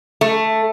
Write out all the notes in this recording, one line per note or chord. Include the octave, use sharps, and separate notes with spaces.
A3